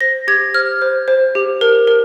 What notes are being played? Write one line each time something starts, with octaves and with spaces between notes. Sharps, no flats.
C5 A#6
G4 G#6
C5 F6
C5
C5
G4
A#4
A#4